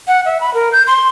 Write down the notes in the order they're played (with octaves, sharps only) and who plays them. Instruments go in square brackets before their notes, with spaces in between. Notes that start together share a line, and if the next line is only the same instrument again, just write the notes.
[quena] F#5
E5
B5
A#4
G6
C6